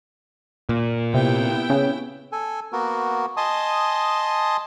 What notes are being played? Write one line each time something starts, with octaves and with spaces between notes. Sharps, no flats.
A#2
C3 B3 E4 G5
C#3
A4 G#5
A#3 B3 F#4 A#4
D#5 G#5 A5 C6 D#6